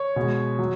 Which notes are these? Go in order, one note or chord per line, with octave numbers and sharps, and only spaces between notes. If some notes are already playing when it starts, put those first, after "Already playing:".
Already playing: C#5
B2 G#3
F#3